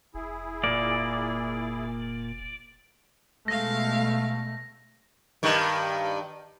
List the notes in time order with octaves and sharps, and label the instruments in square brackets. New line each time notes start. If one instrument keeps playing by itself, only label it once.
[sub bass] F1 [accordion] E4 G#4
[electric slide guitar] A#2 A#3 [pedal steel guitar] D5
[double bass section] B2 A3 [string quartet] G#3 F5 [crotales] A#6
[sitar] G2 D#3